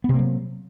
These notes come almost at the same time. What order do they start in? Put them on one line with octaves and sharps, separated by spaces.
B3 C3 A#3 F#3